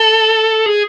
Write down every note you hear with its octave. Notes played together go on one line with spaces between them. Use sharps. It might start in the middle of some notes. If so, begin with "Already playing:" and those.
Already playing: A4
G#4